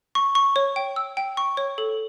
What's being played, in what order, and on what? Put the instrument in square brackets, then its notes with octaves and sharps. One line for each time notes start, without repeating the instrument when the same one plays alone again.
[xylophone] C#6
C#6
C#5
G5
E6
G5
C#6
C#5
A4